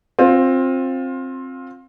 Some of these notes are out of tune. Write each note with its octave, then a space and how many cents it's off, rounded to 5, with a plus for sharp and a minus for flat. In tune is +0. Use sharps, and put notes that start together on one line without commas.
C4 +15 F4 +20